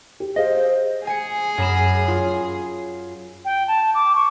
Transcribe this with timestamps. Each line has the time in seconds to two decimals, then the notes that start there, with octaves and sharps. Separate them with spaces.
0.20 G4
0.36 G#4 C5 D#5 F5
1.07 G#4 G#5 C#7
1.58 F#2 B5 E7
2.08 F4
3.45 G5
3.68 A5
3.95 D6
4.15 C#6